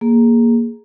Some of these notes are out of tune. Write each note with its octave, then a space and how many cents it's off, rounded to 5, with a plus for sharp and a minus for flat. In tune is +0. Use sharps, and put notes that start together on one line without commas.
A#3 +0 G#4 +0